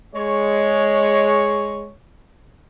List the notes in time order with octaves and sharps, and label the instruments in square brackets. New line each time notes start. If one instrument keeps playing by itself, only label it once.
[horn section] G#3 C#5